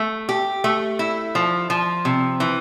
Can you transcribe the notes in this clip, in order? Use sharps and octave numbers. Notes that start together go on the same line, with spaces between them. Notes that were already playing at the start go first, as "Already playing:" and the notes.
Already playing: A3
G4
A3
E4
F3
F3
C3
E3